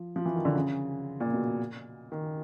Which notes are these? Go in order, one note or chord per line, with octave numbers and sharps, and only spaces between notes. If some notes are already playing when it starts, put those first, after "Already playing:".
Already playing: F3
F3
E3
D#3
D3
C#3
A#2
B2
D#3